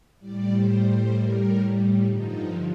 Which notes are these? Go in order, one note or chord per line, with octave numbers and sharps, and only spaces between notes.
A2 G3 D5
C5
C5
A#4
G2 D3 F3 D#4